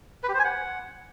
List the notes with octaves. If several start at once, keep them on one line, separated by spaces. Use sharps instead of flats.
B4
G4
C5
G#5
F#5